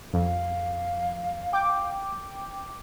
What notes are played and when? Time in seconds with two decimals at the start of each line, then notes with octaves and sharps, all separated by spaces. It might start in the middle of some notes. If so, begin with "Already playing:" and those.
0.13 F2 F5
1.53 G5 D6